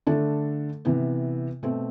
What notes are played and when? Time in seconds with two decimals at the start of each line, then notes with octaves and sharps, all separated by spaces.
0.07 D3 A3 D4 A4
0.85 C3 E3 B3
1.63 B2 A3 C4